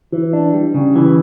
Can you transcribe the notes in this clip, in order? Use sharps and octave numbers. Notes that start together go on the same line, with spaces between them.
E3
D4
G3
C#3
E3